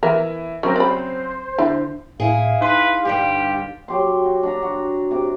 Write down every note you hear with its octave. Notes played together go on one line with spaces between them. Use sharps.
E3 E4 A#4 E5
C#3 F#3 C4 C#4 A#4 C5
C5 D5 B5
D3 E4
A2 E4 G#4 F5
D#4 B4 C6
G2 D3 G3 G4
F#3 G4 C6
F#4
D4 F#4 A#5
F#4
C3 D6